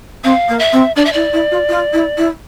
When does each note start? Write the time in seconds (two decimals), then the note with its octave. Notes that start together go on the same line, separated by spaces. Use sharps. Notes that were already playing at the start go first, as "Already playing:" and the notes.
0.24 C4 F5
0.48 A#3
0.59 E5
0.72 C4
0.96 D4 D5
1.05 E5
1.13 E4 D5
1.33 E4
1.51 F4
1.69 F4
1.93 E4
2.17 E4